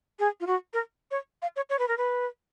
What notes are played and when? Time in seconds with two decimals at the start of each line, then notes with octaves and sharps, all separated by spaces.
0.19 G#4
0.41 F4
0.47 F#4
0.73 A#4
1.11 C#5
1.42 F5
1.56 C#5
1.70 C#5
1.79 B4
1.88 A#4
1.98 B4